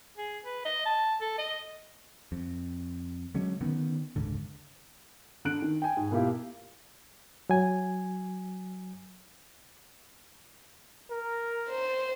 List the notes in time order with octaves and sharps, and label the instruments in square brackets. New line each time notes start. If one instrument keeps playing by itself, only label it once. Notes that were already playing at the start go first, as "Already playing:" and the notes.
[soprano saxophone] G#4
B4
D#5
A5
A4
D#5
[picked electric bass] F2
D3 F#3 G#3 C#4
D3 D#3 B3 C#4
F1 C#2 G#2 D3
[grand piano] D3 F#6 D7
D#3
G5 G#5
G#2
B2 A#3 E4 F4 G4
[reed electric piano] F#3 G#5
[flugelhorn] A#4
[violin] C5